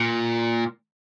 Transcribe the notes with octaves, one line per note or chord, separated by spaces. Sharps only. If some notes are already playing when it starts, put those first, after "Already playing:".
Already playing: A#2